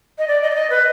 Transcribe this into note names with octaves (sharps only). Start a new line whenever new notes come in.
D#5
D5
D#5
D5
D#5
B4